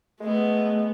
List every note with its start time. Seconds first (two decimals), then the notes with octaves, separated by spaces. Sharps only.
0.21 G#3 A3 B3